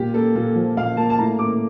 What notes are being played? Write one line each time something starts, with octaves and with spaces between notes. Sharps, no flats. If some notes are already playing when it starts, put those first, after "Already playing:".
Already playing: A#2 G4
A#3 A4
A#2 A4
F3
A#2 F5
A#3 A5
A5
A2 A#5
A#3 D6